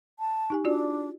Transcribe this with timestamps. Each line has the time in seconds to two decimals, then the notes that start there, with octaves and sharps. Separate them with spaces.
0.19 A5
0.50 D#4 G4 G#5
0.64 D4 F4 F#4 D5